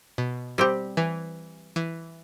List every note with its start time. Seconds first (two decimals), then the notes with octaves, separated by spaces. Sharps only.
0.18 B2
0.58 G3 C4 G4
0.97 E3
1.76 E3